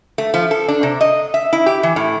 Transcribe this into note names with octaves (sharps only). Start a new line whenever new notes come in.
A3
F3
A4
D4
C3
D#5
E5
E4
G4
E3
A2